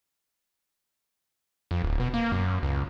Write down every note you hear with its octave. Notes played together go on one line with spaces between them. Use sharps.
F2
D1
B2
A#3
F#2
C#2